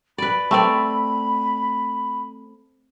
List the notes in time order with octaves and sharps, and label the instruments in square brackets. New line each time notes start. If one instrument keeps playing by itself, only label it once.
[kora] B4 D5 [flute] B5
[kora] A3 C4 D5